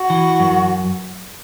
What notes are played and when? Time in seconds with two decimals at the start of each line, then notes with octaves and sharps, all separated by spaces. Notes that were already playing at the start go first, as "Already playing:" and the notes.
Already playing: F#4
0.10 E3
0.40 F#2